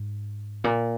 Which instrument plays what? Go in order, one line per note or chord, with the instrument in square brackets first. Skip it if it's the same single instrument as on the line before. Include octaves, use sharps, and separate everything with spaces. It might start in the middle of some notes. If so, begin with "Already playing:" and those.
Already playing: [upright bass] G#2
A#2